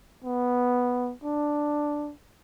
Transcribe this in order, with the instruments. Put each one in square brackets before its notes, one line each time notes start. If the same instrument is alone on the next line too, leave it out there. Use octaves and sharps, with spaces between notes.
[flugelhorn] B3
D4